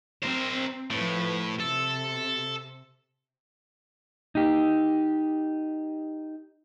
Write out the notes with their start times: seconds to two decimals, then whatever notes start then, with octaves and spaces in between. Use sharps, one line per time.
0.23 C4 A#4 C5
0.91 A2 F3 B4
1.60 C3 A4
4.35 D#4 G4